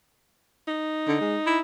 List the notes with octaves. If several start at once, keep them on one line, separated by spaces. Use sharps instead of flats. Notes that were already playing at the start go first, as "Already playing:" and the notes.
D#4
D3
G#3
E4